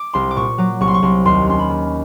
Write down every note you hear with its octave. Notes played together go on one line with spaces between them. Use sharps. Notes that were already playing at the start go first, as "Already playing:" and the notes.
Already playing: D6
C2 C6
D6
A#2 C#6
F#3 D6
C2 C#6
C6
C#6
C2 C6
D#2 C6
C#4 C6
B5
D#3